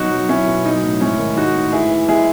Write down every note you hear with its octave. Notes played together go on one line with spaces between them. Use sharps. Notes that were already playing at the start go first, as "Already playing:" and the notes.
Already playing: B2 F#3 D#4 F#4
F#3
F#3 C#4 E4
B2
F#3 D#4
A2
G#2 C#4 E4
D#3
G#3 D#4 F#4
A2
E3 E4 G#4
E3
G#3 E4 G#4